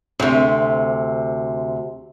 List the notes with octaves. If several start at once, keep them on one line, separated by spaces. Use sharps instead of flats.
D2 C3